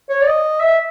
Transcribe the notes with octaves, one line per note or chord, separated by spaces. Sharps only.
C#5
D5
D#5
E5